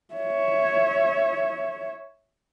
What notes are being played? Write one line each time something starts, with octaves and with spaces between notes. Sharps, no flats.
C#5 E5